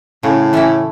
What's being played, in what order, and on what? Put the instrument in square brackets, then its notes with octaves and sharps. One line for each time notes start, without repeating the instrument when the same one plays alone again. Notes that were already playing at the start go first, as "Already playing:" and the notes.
[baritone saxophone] A2 [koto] C#3
[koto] E3 A3 C#4 E4